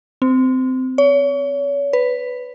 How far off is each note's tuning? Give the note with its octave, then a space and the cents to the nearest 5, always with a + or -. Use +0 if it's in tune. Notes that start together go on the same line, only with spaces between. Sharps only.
C4 -20
C#5 +35
B4 +5